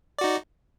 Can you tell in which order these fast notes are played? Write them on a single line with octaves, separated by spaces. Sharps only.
D5 F#4 D#4